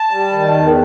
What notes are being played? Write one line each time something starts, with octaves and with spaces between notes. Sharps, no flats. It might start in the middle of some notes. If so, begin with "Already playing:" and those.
Already playing: A5
G3
D#3
E2